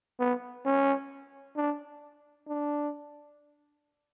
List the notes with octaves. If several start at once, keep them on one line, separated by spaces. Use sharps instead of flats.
B3
C#4
D4
D4